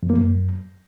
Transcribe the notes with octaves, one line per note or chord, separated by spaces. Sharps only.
F2
A#3
F#2